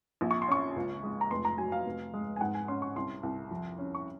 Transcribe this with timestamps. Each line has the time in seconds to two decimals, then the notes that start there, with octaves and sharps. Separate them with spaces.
0.21 A#1
0.31 C#6
0.42 C6
0.48 C#4 C#6
0.76 C#2
1.03 G#3
1.21 A#5
1.31 F1 C6
1.45 A#5
1.58 F#3 G#5
1.72 F5
1.86 F1
2.14 G#3
2.36 G#5
2.41 G#2 F#5
2.55 G#5
2.68 C#4 C6
2.82 C#6
2.95 C2 C6
3.23 C2
3.51 F2
3.78 C#4
3.95 C#6